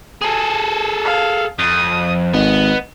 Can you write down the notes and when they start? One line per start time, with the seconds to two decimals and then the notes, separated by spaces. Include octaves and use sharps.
0.21 G#4 A4
1.04 F5
1.59 F2 D#6
2.34 G#1 B3 D#5